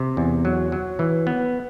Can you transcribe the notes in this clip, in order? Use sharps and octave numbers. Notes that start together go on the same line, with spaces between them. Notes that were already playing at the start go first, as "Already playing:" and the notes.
Already playing: C3
E2
F#3
F#3
E3
B3